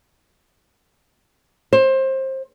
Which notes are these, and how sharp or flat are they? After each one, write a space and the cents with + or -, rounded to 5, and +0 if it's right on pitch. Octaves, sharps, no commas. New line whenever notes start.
C5 +25